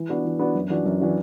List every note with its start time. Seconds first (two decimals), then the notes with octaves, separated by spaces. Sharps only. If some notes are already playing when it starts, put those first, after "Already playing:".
Already playing: E3
0.09 B3 D4 F#4
0.24 E3
0.39 B3 D4 F#4
0.55 F#2
0.70 E3 D4 F#4
0.85 F#2
1.01 E3 D4 F#4